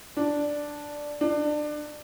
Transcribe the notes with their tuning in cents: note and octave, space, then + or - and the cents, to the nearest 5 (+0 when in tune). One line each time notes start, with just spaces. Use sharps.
D4 +0
D4 +25